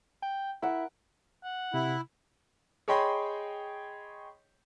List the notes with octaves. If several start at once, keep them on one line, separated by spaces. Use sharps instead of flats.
G5
E4 A#4 F#5
F#5
C3 E4
G#4 C#5 D#5 G5 B5 C6